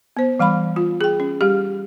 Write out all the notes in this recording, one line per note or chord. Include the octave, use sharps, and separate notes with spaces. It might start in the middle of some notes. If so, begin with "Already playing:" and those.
B3 C5
E3 G3 F5 B5
F4
G#4 G5
C#4
G3 G4